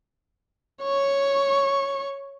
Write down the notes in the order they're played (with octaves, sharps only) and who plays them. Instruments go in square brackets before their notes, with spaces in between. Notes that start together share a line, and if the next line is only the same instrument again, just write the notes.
[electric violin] C#5 C#6